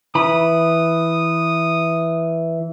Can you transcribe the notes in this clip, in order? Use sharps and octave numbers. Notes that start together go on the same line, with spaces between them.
E3 B5 D#6